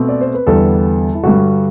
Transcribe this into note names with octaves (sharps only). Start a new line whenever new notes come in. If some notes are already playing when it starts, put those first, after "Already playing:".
Already playing: B2 A3 C4
D5
C5
B4
E2 D3 G3 B3 A4
E4
G2 D3 G3 F#4